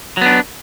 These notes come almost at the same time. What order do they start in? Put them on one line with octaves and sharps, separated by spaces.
F#3 B3 D4